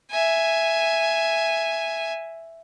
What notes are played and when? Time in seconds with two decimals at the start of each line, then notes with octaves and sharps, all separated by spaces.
0.11 E5 G#5